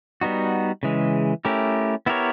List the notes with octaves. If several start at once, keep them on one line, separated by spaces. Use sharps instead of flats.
G3 B3 D#4 F#4
C#3 E3 G#3
A3 C#4 E4 G4 A#4
B3 E4 G4 A#4 C#5